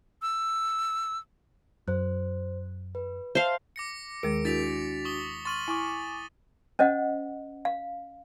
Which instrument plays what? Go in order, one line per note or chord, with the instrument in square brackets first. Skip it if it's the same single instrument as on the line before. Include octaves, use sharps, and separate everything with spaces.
[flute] E6
[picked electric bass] F#2 [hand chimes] C5 F#6
[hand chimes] B4
[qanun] C5 F5 [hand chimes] E5 A5
[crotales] D6 A#6 C#7
[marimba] D#2 D#3 G#3 [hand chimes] G#4 A#4 D7 [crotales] C#7
[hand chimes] D4 F#4 D7 [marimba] E4 [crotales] A6 B6 F7
[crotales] C#6 D#6 G7
[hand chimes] C6 C#6 F6 [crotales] A6 D#7 F#7
[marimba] E4 [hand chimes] G#5 C#6 D6
[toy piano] C#4 C5 D#5 F#5
F5